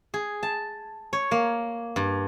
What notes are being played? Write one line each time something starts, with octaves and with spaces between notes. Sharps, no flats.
G#4
A5
C#5
A#3
G2